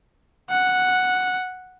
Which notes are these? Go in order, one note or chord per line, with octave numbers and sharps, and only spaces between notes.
F#5